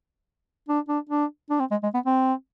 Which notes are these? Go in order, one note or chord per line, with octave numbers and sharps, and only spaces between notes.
D4
D4
D4
D4
C4
G#3
G#3
B3
C4